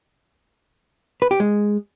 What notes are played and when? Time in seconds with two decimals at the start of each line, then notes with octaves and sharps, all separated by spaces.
1.22 B4
1.31 G4
1.40 G#3